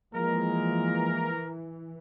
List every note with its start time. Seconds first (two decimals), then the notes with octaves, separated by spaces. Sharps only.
0.14 E3 F3 G#3 A#3 A#4